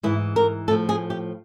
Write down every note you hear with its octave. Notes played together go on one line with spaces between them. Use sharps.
G#2 E3 E4
A#4
A2 F3 A4
G#4
G4